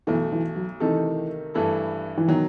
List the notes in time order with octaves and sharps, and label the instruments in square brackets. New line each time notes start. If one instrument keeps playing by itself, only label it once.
[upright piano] B1 B2 A3 [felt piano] E3
[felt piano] E3
F#3
[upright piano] C3 D#3 A3 D#4 A4 [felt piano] E3
[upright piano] G2 E3 A3 E4 A4
[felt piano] E3
[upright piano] B2 F#3 [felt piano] D#3